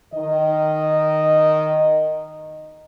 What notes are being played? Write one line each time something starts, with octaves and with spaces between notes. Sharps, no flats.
D#3 D#5